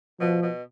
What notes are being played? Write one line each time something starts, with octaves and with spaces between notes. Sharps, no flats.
B2 F3
B2